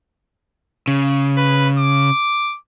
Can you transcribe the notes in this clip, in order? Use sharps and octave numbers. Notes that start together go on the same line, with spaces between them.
C#3
B4
D6